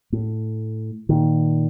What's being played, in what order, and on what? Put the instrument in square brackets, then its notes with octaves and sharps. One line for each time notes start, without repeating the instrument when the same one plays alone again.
[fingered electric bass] A2
A#2 D#3